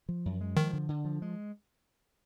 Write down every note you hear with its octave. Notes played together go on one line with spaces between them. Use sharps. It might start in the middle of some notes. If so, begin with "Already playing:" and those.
F3
F#2
G#3
D#3 F3
D3
D3
F3
G#3